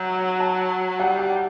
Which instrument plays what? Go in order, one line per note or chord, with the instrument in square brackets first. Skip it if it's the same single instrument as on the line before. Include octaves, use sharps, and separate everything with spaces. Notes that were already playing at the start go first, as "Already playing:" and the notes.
Already playing: [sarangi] F#3 [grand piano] G6
[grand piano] A5
[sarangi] G3 [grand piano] F#5
[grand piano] F#5